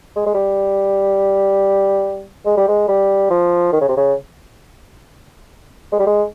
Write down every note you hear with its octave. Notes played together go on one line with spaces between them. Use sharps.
G#3
G#3
G3
G#3
G3
G#3
G3
F3
D#3
C#3
C3
C#3
G#3
G3
G#3